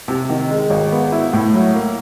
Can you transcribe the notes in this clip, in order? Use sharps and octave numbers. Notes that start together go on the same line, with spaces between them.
C3
D#3
G#3
G#1
B3
E4
A2
F#3
A#3